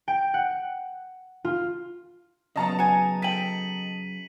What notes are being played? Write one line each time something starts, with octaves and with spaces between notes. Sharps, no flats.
G5
F#5
F4
C#3 F#3 B3 D#5 A5 A#5
F#4 G#5 C#7
A4 G5 B6 D#7 F#7